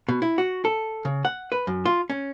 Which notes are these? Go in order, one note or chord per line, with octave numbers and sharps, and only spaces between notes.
B2
E4
F#4
A4
C#3
F#5
B4
F#2
F4
C#4